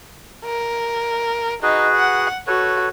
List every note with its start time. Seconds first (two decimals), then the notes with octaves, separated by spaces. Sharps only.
0.45 A#4
1.63 D#4 F#4 G#4 B4
1.96 F#5
2.47 F#4 A4 B4 C#5